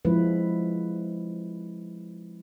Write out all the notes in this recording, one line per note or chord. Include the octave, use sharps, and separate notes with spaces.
F3 G#3 C4 E4 B4